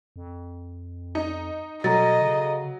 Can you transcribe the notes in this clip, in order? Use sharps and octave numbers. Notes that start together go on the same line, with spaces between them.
F2
D#4
B2 F#3 A4 D#5 A#5 A6
C#3